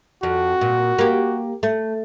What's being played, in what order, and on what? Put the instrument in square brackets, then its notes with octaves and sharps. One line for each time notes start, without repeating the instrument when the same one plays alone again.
[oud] F2 [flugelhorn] F#4
[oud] A#2
A#3 G4
A3